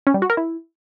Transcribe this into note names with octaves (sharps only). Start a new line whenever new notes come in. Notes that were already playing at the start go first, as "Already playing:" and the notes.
C#4
G3
F#4
A#4
E4